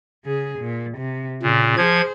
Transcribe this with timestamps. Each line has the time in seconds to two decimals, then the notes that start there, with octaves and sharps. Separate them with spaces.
0.25 C#3 G#4
0.59 A#2
0.98 C3
1.43 A#2 C#3
1.77 F3 G#4 C5 G#6